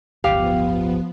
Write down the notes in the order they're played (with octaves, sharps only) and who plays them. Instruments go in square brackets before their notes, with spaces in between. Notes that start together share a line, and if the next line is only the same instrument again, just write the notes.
[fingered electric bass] D1 G1 [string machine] F3 B3 [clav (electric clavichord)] G4 [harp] F5